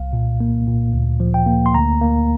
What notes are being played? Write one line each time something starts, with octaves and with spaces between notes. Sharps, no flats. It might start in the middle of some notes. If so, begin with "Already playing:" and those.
Already playing: C2 F5
A#2
A#3
A#2
D2
F3
G5
A#3
C6
D2 A#5
A#3